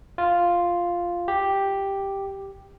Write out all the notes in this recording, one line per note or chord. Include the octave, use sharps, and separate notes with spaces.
F4
G4